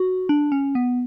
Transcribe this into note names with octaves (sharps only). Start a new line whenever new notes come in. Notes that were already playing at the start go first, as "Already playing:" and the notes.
Already playing: F#4
D4
C#4
B3